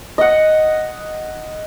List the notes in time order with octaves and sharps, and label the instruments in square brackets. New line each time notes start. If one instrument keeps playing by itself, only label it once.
[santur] D#5 F#5